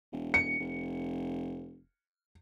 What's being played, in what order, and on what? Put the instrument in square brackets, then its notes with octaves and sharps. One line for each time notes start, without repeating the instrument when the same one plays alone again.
[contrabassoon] E1
[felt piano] C#7
[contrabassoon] F1